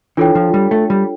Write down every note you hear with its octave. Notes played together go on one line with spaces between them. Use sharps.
E3 D4 F4 A4 C#5 G5
F3
G3
A3
G3